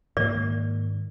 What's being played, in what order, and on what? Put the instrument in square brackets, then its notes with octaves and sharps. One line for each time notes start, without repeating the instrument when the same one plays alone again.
[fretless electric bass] G#2 D#3 A#3 [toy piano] D5